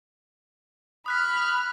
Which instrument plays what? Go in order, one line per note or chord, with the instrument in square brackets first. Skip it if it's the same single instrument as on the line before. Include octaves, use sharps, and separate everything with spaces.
[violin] B5 F6 [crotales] D#6 F#6 B6